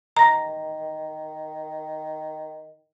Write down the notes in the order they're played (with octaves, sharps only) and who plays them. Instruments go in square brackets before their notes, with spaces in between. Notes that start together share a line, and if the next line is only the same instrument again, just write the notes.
[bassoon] D#3 [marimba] A#5 A#6